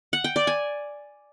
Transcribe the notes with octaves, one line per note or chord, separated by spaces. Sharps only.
F#5
G5
D5
G#5